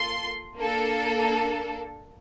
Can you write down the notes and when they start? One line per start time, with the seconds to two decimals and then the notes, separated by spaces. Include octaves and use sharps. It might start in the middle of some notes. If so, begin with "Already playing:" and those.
Already playing: A#3 F4 A4 C6
0.57 A#3 D4 A4